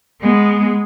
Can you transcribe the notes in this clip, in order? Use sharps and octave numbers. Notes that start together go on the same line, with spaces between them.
G#3 B3